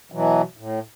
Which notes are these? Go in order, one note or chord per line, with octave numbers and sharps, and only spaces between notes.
B2 E3 F#3
A2